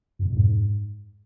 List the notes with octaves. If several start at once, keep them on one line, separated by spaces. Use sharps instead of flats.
F#2
B2
F2
G#2